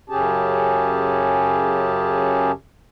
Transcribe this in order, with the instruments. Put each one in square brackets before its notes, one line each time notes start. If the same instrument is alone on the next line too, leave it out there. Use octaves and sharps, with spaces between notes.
[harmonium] F#2 C#3 C#4 G4 G#4 A5